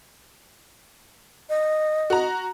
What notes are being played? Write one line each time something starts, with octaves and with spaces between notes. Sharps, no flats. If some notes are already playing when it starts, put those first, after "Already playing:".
D#5
F#4 A#5